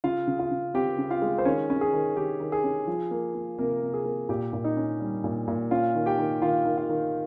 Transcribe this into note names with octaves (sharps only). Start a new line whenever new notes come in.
C#3 F4 F5
C#3
F4 F5
C#3
C4 G4 G5
C#3
F4 F5
G#3
C5
D#3 C#4 C#5
C#4
G#4
D#3
D#3 G4
D#3
G#4
C#4
F3
A#3
A#3
C3 A#3 A#4
C3
G#4
A#3
A#2 G4
A#2
D#4 D#5
C#4
G3
A#2
A#2
C#4 F4 F5
D#3
G4 G5
D#3
D#3 F4 F5
D#3
F4 F5
D#3